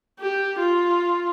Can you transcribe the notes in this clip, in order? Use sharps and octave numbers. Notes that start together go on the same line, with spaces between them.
G4
F4